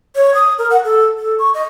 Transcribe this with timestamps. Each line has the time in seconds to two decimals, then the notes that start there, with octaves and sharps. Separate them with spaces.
0.15 C#5
0.35 D#6
0.58 A#4
0.70 F#5
0.84 A4
1.18 A4
1.39 C#6
1.54 D#5